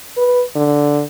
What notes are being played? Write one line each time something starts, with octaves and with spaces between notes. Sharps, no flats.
B4
D3